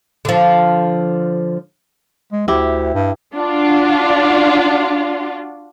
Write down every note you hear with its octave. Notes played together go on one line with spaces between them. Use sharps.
D3 F3
G#3
D2 E4 G4
G2
D4 F4 F#4